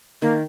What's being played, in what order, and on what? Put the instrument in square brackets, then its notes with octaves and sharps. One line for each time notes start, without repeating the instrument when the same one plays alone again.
[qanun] D#3 [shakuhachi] A#3